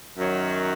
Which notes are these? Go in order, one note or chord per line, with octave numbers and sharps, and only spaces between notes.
F#2 D#3 F#3